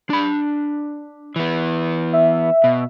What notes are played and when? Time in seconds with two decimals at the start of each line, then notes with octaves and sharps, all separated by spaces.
0.10 D4 B5
1.36 E3 B3
2.13 E5
2.64 B2